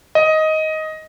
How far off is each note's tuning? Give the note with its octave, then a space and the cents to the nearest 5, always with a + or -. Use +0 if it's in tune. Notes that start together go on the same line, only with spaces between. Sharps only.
D#5 +10